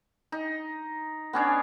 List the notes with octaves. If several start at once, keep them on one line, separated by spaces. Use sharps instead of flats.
D#4
B3 C#4 D4 C#5